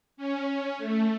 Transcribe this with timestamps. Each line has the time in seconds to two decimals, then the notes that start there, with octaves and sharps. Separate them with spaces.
0.17 C#4
0.78 A3